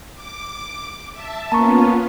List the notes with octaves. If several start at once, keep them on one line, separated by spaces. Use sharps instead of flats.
D6
E5 A5
A#3 B3 C#4 F4 A5 A#5 C#6